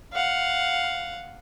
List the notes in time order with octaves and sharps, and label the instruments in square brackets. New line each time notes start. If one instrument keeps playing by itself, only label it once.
[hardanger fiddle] F5 F#5